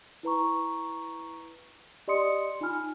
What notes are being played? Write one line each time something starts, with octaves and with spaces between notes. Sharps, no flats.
E4 B4 A#5 C#6
G4 D5 D#5 C6 D#6 C#7
D#4 F4 G#5 B5 F6